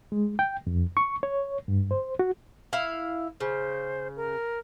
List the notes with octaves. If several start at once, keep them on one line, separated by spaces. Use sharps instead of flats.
G#3
G5
F2
C#6
C#5
G2
C5
F#4
E4 F5
C#3 C5
A#4